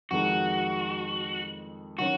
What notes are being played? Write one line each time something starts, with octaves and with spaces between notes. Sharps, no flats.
F2 D#3 G#3 F#4
D#3 F#3 C#4 F#4